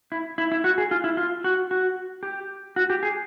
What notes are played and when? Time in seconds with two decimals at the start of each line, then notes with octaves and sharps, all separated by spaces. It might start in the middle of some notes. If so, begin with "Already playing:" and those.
0.12 E4
0.38 E4
0.52 E4
0.64 F#4
0.78 G#4
0.91 F4
1.04 E4
1.17 F4
1.44 F#4
1.71 F#4
2.23 G4
2.76 F#4
2.90 G4
3.03 G#4